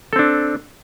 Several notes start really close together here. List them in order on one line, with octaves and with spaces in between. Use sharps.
A4 C4 D4